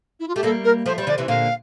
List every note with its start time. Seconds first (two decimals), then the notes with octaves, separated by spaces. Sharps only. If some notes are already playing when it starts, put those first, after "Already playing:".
0.19 E4
0.28 F4
0.35 A3 G4
0.43 G3 A#3 A4
0.64 A#4
0.86 F3 A3 C5
0.98 G3 C5
1.07 D3 F3 D5
1.18 C3 E3
1.28 A#2 D3 F5